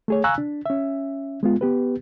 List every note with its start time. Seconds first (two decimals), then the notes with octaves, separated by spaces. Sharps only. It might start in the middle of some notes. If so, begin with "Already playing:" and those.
0.08 A3 G#4 C#5
0.24 F5 G#5 A#5 C#6 E6 F#6
0.38 D4
0.66 C#4 E5
1.43 G#3 B3 F4
1.61 B3 G4 B4